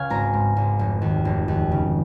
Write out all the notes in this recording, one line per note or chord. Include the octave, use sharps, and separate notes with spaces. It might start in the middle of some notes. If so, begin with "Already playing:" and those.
Already playing: C#2 C#3 C#5 F5 G#5
G#1 A#5
G#2
G#1
F1
D#2
F1
D#2
C#3